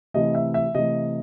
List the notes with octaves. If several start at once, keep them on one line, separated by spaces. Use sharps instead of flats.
C3 E3 A3 D#5
E5
E5
C3 E3 A3 D#5